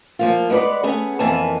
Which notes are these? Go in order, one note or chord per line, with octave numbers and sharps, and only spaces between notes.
F3 A#3 F4
G#3 B3 A#4 B4 D5
A3 B3 C#4 G#4
F2 E3 A#3 B3 G#5 A5